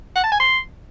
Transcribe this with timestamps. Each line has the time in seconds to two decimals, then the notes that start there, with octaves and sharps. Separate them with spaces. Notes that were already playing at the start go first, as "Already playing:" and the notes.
0.15 F#5
0.24 A5
0.32 G#5
0.40 C6